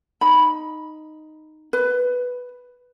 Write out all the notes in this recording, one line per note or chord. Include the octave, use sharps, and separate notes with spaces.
D#4 B5
B4